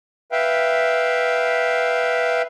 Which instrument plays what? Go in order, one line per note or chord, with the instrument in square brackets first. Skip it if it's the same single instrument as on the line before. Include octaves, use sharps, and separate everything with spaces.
[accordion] B4 E5 F5 G5